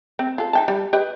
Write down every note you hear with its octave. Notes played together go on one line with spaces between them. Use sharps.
C4
F4 A4
D#4 G5 A5
G3
G4 B4 D#5